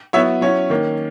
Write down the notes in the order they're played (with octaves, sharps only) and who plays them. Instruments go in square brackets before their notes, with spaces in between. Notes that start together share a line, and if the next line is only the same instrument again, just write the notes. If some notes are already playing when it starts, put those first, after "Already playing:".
[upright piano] F#3 B3 E4 C#5 E5
F#3 C#4 E4 C#5
D#3 A#3 C#4